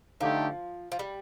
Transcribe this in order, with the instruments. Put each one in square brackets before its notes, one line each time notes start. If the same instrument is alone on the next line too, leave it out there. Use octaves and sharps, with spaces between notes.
[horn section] D3 A3 D#4 G4 [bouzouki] F3
[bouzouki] F3
G3